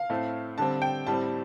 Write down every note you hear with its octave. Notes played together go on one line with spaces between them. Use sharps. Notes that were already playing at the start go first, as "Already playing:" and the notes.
Already playing: F5
A2 A3 C4
D3 G3 C4 A5
G5
A2 G3 C4 A5